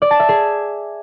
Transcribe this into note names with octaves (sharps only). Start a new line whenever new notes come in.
D5
A5
E5
G#4